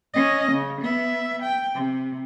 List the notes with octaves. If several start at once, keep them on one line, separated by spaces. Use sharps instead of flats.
C#4 D#5
C#3
B3 E5
G5
C3